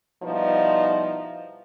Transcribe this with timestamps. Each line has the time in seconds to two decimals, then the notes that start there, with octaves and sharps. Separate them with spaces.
0.23 B2 F3 G3 D#4 E4